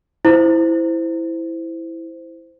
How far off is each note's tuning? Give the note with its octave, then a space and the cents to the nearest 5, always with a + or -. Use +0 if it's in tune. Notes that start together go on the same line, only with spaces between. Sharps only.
E4 +0 C5 -15